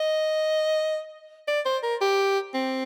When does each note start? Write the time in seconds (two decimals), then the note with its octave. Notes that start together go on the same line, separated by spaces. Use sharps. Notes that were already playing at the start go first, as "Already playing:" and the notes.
Already playing: D#5
1.48 D5
1.65 C5
1.83 A#4
2.01 G4
2.54 C4